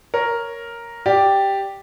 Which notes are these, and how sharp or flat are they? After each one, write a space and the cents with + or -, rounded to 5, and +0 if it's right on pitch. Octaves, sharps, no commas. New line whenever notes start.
A#4 +0 C#5 +0
G4 +0 D5 +0